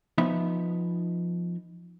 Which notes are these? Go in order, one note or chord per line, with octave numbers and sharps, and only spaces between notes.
F3 B3 D#4 E5